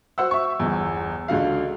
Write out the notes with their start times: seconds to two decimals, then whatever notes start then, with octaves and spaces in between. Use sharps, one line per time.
0.18 F#4 C5 F#5 E6
0.31 E5 C#6
0.59 G1 E2
1.28 C#2 D3 F#4 F5